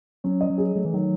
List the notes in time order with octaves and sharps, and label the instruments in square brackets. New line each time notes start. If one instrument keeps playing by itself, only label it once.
[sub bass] F#3 [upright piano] C#4
[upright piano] D#5
[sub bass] F#3
[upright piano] G#4
[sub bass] F#3 [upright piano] A3
[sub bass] E3
[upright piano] D#3 [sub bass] F#3